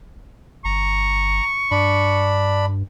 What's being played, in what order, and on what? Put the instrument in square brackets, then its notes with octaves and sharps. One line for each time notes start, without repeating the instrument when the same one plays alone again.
[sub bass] G1 [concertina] A#5 [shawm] C#6
[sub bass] G2 [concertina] D4 B5